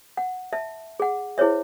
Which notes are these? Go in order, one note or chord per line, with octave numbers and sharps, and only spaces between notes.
F#5
E5 A5
G#4 F#5
E4 G#4 C5 C#5 E5